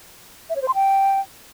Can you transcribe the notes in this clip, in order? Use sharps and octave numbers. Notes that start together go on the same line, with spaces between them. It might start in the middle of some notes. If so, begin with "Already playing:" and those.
E5
C#5
C5
C6
G5